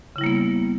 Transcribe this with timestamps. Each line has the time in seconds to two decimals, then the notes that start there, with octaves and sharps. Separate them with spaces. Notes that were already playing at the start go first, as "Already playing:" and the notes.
0.16 C#3
0.18 E4
0.21 G3
0.24 A#3
0.26 B3